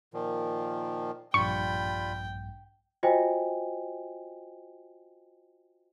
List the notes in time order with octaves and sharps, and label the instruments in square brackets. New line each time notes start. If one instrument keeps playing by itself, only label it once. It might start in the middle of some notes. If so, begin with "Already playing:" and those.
[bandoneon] A#2 D#3 F3
[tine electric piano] A#1 G2 [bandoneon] G3 F4 B5 [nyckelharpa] G5 [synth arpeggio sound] C#6
[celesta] F4 F#4 C5 D#5 G5 G#5